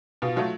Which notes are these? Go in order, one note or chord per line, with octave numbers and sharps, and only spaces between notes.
B2 F4
F#3 A3 F4